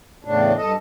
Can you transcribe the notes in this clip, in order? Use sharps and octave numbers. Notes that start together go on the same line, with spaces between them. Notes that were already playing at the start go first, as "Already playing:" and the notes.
E2 A2 C#3 D4
G2 A4 D#5